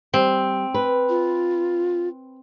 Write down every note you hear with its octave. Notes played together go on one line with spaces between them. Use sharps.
G3 C4
B4
F4